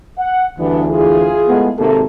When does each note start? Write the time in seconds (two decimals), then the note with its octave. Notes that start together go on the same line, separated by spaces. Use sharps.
0.18 F#5
0.59 D2 G2 E3 B3 D4
0.90 E4 F4 G#4
1.48 G#3 A3 B3
1.78 G#1 C3 A3 A#3 A4